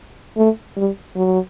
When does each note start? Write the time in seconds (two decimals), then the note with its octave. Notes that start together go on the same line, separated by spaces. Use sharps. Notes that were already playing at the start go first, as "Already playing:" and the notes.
0.37 A3
0.77 G3
1.16 F#3